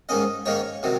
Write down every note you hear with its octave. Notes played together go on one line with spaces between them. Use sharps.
G#2 D#3 A#3 C#4 D#5
G#2 D#3 A#3 C#4 C#5
C3 D#3 F#3